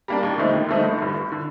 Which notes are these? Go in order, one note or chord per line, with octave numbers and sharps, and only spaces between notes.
G3 A#3 D4
D#2
D3 F3 A3 D#4
D#2
D3 F3 A3 D#4
G1
G2 D3
G1
D3